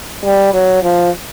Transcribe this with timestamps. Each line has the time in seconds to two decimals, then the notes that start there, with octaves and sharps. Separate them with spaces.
0.24 G3
0.53 F#3
0.83 F3